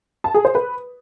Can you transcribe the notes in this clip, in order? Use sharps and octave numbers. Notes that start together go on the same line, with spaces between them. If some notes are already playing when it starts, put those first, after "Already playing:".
A5
G#4
C5
B4